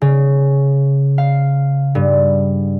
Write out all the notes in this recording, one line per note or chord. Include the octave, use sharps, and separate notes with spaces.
C#3
F5
G2